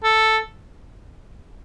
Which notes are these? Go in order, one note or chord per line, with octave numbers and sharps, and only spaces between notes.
A4